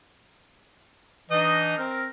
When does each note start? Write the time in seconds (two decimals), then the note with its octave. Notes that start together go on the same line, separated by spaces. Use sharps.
1.31 E3 D4 D#4 D#5
1.78 C4 A#4